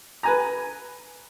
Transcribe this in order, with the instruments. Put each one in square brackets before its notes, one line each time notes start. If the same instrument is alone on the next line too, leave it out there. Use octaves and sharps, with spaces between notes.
[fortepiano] B4 G#5 A#5